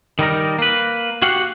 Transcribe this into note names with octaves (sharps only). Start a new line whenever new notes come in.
D#3 G3 D#4 A#4
A#3 B4
F#4 G4 F5 F#5